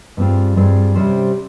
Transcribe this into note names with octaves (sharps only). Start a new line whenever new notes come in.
G2 G3 C4 F4 G#4
G2 G3 C4 F4 G#4
C3 G3 C#4 G4 C5